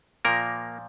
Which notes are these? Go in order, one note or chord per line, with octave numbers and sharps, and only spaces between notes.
A#2 F3 A#3 A#4